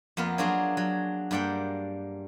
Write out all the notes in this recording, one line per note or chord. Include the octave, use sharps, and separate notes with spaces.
F2 A#3 B3 F4
F#3 A#3 D4 F4 F#4 G#4
F#3
G2 A#3 D5 F#5 G5